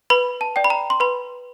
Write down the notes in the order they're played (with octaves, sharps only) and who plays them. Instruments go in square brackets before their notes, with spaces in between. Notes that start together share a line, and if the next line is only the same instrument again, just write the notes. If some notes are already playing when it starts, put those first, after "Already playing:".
[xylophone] B4 B5
A5
D5 G5
B5
A#5
C6
B4 B5